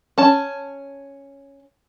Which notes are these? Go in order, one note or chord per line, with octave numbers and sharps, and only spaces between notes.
C#4 A5